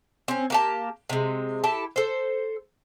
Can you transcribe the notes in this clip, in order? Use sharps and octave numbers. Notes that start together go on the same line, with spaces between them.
C4 C#4
A#3 G4 A5
C3 G#3
E4 G4 A4 A5
A4 C5